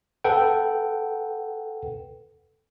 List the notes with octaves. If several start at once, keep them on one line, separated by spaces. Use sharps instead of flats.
A4 B4 F#5 G5